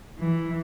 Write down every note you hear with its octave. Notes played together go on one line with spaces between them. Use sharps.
E3